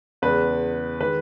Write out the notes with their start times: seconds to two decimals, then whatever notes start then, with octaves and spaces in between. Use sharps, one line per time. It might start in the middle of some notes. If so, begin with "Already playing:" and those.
0.22 E2 C#3 G#3 B4
1.00 D#3 G#3 B4